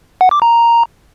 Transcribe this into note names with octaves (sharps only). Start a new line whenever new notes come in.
F#5
D6
A#5